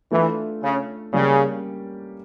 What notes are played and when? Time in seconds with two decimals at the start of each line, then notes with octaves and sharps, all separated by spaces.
0.11 E3 A3 D4 F4 A4
0.63 C#3
1.13 C#3 G3 A#3 C#4 G4 D5